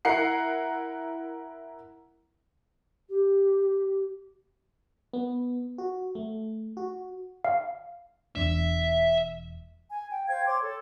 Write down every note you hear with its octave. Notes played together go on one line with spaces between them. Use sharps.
E4 A#4 F#5 C7
G4
B3
F#4
A3
F#4
F5
E1 E2 D4 E5
G#5
G5
C5 F5 G5 G#6
C#5 C6 D6
A4